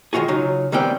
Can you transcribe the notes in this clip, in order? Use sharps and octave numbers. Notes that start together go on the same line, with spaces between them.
D#3 G#3 F4 F#4 G#4
C#3 F#3 D#4 F4
D#3 E3 G3 B3 C4 G5